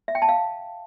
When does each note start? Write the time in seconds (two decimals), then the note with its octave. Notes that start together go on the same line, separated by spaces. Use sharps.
0.08 E5
0.15 G5
0.22 A5
0.29 F5